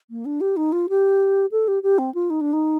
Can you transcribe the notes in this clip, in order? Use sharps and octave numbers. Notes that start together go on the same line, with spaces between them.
A#3
D4
G4
D#4
F4
G4
A4
G4
G4
C4
F4
D#4
D4
D#4